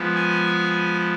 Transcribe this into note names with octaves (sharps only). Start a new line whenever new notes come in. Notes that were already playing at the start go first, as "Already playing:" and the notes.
Already playing: F3 G#3 B3
G#5
G#5